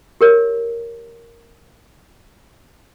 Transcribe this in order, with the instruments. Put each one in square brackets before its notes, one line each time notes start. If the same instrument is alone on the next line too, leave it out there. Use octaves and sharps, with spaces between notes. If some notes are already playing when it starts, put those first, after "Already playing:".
[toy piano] G4 A#4 C#5